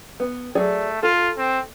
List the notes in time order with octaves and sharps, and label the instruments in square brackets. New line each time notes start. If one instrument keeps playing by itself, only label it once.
[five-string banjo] B3
[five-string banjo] F#3 G#4 D5 [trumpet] A3
[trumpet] F4 [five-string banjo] A4
[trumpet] C4